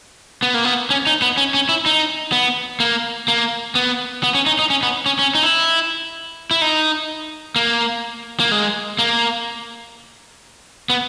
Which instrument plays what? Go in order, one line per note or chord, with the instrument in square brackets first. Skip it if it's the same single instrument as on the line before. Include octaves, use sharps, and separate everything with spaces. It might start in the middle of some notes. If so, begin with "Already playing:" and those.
[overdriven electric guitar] B3
A#3
B3
C#4
D#4
B3
C#4
C#4
E4
D#4
B3
A#3
A#3
B3
B3
C#4
D#4
D#4
C#4
B3
C#4
C#4
D#4
E4
E4
D#4
A#3
A#3
G#3
A#3
B3